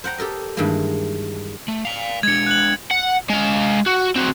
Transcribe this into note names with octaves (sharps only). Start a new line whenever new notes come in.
C5 F#5 G5 A#5
G4 A4 A#4 D#5
G2 D#3 E3 G#3 A#3
A3
D5 F5 F7
G#3 D4 G#6 C#7
F#6 F#7
F#5
G#3 F5
F#4
C4 F#4